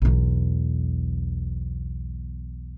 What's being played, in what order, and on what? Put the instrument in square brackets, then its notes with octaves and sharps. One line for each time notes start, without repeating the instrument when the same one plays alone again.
[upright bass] B1 E2